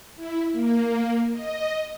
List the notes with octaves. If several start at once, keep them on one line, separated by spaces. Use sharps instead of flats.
E4
A#3
D#5